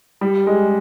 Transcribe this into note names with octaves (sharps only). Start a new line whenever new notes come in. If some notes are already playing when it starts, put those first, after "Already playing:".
G3
G#3